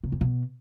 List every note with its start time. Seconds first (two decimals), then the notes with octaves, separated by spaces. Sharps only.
0.04 C3
0.12 F2
0.21 B2